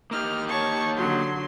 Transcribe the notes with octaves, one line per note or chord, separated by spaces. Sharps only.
A#3 D#4 G4 F6
C#5 A5 C#6
D3 F#3 C6